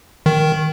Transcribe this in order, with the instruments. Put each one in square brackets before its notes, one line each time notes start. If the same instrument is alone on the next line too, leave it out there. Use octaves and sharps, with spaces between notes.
[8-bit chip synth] D#3